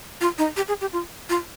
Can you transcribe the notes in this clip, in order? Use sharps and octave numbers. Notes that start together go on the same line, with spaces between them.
F4
D#4
G4
G#4
G4
F4
F4